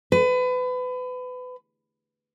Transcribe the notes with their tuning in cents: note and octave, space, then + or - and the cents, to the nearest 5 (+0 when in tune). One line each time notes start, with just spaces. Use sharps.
B4 +30